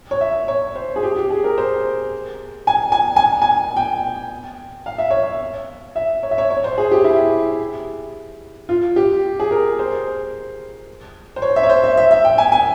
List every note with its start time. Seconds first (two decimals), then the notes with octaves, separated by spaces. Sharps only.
0.11 C#5
0.21 E5
0.48 C#5
0.75 C5
0.96 G#4
1.03 G4
1.16 G4
1.30 G#4
1.44 A#4
1.58 C5
2.67 G#5
2.92 G#5
3.16 G#5
3.42 G#5
3.77 G5
4.86 F5
4.98 E5
5.10 C#5
5.23 E5
5.96 E5
6.23 C#5
6.31 E5
6.38 C#5
6.50 C#5
6.64 C5
6.78 G#4
6.91 G4
7.04 E4
8.69 F4
8.96 G4
9.40 G#4
9.51 A#4
9.79 C5
11.36 C5
11.42 C#5
11.56 E5
11.63 C#5
11.69 C5
11.84 E5
11.97 E5
12.11 E5
12.25 G5
12.38 G#5
12.52 G#5